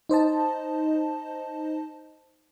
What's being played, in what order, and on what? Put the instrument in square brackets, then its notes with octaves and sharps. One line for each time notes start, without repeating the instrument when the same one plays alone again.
[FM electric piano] D#4 C5 D#5 A5